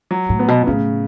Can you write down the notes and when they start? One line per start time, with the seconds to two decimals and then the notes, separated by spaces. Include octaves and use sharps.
0.11 F#3
0.29 A2
0.39 B3
0.48 B2
0.67 A2 C#3